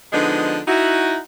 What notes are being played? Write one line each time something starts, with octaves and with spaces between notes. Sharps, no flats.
D3 F3 G#3 B3 D4 D#4
D#4 E4 F#4